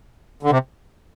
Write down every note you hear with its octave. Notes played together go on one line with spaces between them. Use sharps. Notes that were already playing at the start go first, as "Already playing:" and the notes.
D3
C3